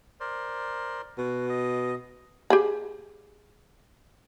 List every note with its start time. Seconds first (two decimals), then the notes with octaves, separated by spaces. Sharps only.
0.20 A#4 C5 D5
1.18 B2 F#4
1.49 D#5
2.50 G4 G#4 B5